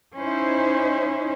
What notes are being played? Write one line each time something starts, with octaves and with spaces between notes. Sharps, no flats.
C#4 D#4 E4 C5